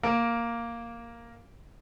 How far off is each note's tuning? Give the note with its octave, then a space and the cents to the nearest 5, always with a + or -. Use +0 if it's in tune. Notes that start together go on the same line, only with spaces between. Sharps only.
A#3 +0 A#4 +0